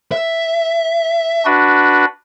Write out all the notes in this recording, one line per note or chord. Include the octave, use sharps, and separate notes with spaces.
E5
D4 F#4 B4